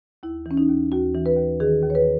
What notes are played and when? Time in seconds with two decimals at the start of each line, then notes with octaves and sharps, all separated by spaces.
0.23 D#2 E4
0.46 E3 C#4
0.57 D#4
0.69 D#2
0.92 D#2 F#4
1.14 E3
1.26 B4
1.37 D#2
1.60 D#3 G#4
1.83 D#2
1.90 C#5
1.95 B4